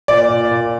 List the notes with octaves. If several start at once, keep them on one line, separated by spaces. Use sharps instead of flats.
A#2 D5
A#2
A#2